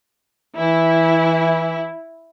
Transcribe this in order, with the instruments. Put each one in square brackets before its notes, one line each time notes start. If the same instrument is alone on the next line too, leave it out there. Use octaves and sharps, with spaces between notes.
[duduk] E3 [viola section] E4